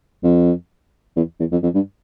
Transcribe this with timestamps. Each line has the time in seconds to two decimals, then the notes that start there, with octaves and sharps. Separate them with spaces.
0.24 F2
1.16 E2
1.40 E2
1.52 F2
1.63 F2
1.74 G2